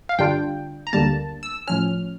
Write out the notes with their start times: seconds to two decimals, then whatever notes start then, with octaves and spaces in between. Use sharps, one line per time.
0.09 F5
0.18 G2 D3 G3 D4 F4 G5
0.87 A#5
0.93 D2 D3 G3 A#3 A5
1.43 E6
1.68 A2 F3 C#4 F6